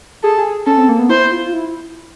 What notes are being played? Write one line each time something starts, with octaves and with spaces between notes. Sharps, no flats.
G#4 A4
G#4
C#4 A4
C4
A#3
B3
E4 C5
F4
E4